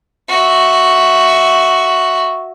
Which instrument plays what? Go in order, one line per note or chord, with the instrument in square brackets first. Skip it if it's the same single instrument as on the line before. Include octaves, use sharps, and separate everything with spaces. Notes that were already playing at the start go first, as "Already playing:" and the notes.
[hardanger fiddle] F#4 E5